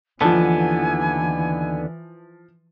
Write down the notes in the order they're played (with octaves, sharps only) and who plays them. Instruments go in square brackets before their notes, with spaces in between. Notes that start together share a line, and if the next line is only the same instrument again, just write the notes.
[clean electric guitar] D#2 D3 B3 [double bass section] E3 [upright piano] F3 A5 [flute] G#5